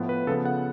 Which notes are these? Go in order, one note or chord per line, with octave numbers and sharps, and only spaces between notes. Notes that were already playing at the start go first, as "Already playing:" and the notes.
Already playing: A2 F3 B3
B4
C#3 F3 B3 A4
F#5